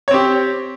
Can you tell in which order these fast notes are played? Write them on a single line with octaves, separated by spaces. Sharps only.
C#5 C4 G4